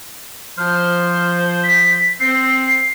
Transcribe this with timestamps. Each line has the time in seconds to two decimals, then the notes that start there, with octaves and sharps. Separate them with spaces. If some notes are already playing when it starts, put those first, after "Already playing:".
0.57 F3 C5 F6
1.64 B6
2.20 C4 C7